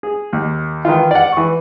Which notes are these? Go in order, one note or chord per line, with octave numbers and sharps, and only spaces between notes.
G#4
D#2
D#3 E3 F4
D5 F#5
E3 C#6